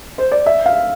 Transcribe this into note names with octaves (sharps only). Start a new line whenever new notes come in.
C5
D5
E5
F5